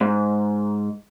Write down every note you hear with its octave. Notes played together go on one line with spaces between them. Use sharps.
G#2